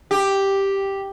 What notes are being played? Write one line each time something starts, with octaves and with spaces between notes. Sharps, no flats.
G4